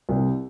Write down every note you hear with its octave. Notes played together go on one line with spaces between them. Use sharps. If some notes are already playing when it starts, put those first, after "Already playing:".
C2